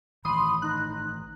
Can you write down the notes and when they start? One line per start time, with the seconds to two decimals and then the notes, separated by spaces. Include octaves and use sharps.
0.25 A1 D#3 E3 B5 C6 D#6
0.62 D#4 F#6